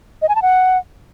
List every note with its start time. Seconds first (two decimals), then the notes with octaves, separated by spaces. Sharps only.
0.22 D#5
0.29 G#5
0.35 A5
0.42 F#5